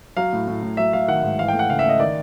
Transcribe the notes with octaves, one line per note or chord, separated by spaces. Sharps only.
F#3 F5
A2
A2
A2
F#3 E5
F#3 F5
D#3 F#5
G#2
E3 F5
A3 G5
F#5
C#3 F5
E5
A3 D#5
D#3 D5